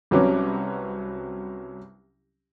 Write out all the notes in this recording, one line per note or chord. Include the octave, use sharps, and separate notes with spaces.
C2 F#3 C4 C#4 B4 D6